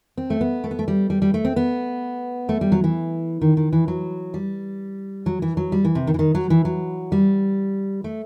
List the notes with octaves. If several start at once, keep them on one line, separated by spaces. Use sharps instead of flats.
C4
A3
B3
A3
B3
A3
G3
G3
G3
A3
C4
B3
A3
G3
F#3
E3
D#3
D#3
E3
F#3
G3
F#3
E3
F#3
G3
E3
C3
D#3
E3
D#3
F#3
E3
F#3
G3
A3